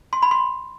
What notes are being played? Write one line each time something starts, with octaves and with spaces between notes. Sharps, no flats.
C6
B5
C6